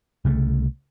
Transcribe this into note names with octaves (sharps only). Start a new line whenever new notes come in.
C2 C#3 G#3 A3